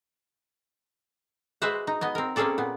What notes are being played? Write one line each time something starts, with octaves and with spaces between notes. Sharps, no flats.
G#3 F#4 B4 C5 E5 F#5
D#4
B3 D#5 G#5
C4 A#4
A#3 C4 C#4 G#4 A4 D5
A#2 B3